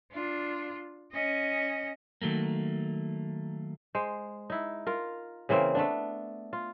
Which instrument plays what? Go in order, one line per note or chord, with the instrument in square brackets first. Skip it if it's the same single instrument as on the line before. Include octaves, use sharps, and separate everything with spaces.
[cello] D4 F4
C#4 D#5
[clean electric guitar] D#3 F#3 A3 A#3
[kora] G#3 C5
D#4 E4
F4 A#4
C#3 E3 A#3 C4
A3 B3 D4
F4